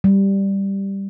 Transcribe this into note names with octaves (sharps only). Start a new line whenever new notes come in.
G3